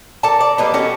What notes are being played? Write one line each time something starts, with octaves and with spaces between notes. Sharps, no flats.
A4 A#4 D5 A5
D5
G3 A#3 B3 D#4
C#4 F#4 G4 A4